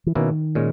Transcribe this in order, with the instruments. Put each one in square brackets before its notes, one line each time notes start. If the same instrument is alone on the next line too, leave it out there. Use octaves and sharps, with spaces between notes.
[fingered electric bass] E3
[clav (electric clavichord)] B2 A#3 C#4 E4 [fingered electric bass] D#3
[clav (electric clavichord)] A#2 G#3 C#4